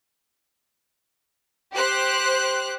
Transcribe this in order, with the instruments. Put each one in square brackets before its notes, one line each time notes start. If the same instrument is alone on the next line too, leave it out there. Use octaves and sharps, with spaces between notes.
[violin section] G4 C5 F#6